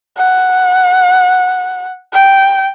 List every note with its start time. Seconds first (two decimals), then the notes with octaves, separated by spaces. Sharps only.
0.18 F#5
2.13 G5